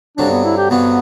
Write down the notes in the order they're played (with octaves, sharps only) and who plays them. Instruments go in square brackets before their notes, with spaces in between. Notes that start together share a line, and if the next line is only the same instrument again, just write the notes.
[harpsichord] G2 D3 F#3 C4 [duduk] D4
[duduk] B3
E4
G4
[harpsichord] G2 D3 F#3 C4 [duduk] B3